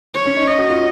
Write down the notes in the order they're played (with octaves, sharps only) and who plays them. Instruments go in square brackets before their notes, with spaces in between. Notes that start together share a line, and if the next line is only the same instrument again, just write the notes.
[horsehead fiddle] C#5
[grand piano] C#4
D#4
[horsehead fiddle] D#5
[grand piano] F#4
F4